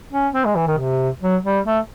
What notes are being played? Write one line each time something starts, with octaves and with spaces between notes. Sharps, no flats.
C#4
C4
G#3
E3
D#3
C3
F#3
G3
A3